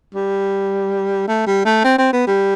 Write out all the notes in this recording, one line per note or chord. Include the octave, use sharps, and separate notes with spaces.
G3
A3
G3
A3
C4
C4
B3
G3